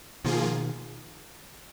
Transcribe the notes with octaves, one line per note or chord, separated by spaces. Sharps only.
B2 D#3 F3 A#3 F4 G#4